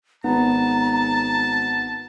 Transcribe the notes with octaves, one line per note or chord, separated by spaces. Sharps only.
G#1 B3 A5 A#5